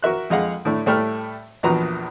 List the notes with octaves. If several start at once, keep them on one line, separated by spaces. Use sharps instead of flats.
F#4 A#4 E5 F#6
F2 G#3 F5 F#5
A2 D3 A3
A2 G3 A3 A4 G5 F6
A#1 E2 F3 F#4 B4 A#5